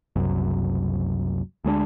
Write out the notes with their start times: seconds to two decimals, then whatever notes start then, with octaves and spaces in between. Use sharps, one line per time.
0.16 F#1 C2 F#2
1.64 D2 G#3 B3 D4